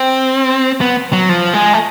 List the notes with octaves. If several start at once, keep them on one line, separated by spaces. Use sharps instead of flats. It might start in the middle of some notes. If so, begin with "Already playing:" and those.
Already playing: C4
B3
F#3
F3
G#3
A3